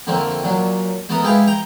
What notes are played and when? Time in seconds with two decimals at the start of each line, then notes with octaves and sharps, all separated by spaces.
0.07 F2 D3 A3 A#3 C4
0.43 A#2 F#3 D4
1.09 A3 B3 A4 A#4 D#6
1.23 G#3 E4 G4 B4 F5
1.47 G5 A#5